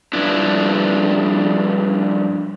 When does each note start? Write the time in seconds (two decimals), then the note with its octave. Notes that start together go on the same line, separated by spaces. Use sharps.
0.13 G2 F3 D4 E4